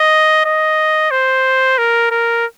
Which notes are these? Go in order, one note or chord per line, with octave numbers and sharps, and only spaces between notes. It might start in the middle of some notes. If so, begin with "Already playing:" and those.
Already playing: D#5
D#5
C5
A#4
A#4